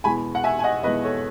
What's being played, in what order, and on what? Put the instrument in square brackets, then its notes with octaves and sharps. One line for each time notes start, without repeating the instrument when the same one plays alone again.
[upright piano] E2 B2 G#3 G#5 B5
F#5
E5 G#5
G#5
D#5 F#5
E2 B2 G#3 B4 D#5
A4 C#5